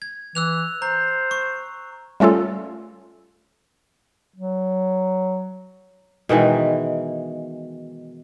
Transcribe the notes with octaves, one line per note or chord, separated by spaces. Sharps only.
G#6
E3 E6 F#6 F7
C5 A#5
C#6
G3 A3 C#4 F4 A4
F#3
B2 D#3 E3 G#3